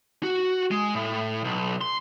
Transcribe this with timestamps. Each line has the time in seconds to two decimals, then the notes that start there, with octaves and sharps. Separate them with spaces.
0.23 F#4
0.71 G#3
0.95 A2
1.44 B1
1.81 C6